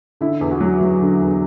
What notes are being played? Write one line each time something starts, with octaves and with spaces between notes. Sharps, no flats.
D3 E4
E2
F#4
F#3
F#3
D3
E2